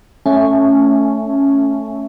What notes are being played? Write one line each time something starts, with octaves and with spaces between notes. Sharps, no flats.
A3 C#4